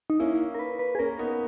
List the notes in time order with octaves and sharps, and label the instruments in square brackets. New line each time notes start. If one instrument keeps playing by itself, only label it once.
[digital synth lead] D#4
[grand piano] A#3 C#4 [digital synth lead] E4
[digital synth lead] A#4
B4
B4
G#4
[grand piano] A#3 C#4 [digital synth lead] A#4
[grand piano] B3 D#4